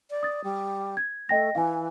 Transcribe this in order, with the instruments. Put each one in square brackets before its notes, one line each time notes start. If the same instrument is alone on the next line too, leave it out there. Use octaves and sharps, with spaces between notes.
[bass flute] D5
[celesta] D#6 A6
[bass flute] G3
[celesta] G#6
[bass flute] A3 [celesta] D#5 G5 A#6
[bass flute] E3 [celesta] F5 G#5